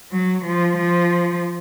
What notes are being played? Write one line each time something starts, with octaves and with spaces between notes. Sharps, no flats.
F#3
F3
F3